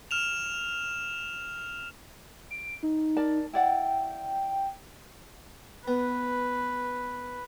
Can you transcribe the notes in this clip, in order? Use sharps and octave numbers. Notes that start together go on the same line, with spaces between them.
F6 E7 F7
D7
D#4
A#4 D5 A5
E4 D5 F#5 G5
B3 B4